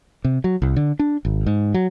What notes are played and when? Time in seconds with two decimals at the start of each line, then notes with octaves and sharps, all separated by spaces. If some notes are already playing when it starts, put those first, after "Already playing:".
0.24 C3
0.44 F#3
0.62 C2
0.76 D3
0.99 D4
1.25 G#1
1.46 G#2
1.74 F#3